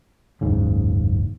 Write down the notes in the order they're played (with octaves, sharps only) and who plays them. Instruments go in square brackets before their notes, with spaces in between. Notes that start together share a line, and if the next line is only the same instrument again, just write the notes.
[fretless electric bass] F#1 D#2 G#2 C#3